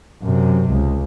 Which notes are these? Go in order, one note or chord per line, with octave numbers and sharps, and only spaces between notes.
F#2 C3
C#2